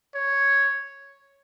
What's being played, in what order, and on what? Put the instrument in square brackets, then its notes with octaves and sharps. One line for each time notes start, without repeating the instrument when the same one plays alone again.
[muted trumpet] C#5